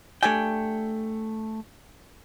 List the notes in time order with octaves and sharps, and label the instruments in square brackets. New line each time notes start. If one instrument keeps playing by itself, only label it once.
[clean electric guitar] A3 G5 [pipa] D4 G4 G#5